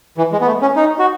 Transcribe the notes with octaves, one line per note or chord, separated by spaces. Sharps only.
E3
G#3
B3
A3
C#4
D#4
F#4